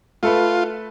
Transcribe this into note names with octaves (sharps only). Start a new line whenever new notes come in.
A3 F4 A4 B4